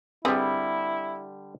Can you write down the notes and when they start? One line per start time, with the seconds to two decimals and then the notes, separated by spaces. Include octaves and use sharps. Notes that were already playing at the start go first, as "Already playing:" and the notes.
0.25 D3 G3 C4 E4 G#4 B4